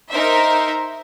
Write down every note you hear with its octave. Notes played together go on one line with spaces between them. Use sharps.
D#4 A#4 C5 E5